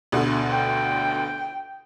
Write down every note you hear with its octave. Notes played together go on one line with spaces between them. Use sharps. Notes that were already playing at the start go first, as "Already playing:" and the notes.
D2 B2 D3
G5